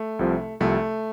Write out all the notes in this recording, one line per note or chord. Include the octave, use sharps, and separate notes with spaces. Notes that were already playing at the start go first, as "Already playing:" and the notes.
Already playing: A3
C2 C3 F3
C2 C3 F3 A3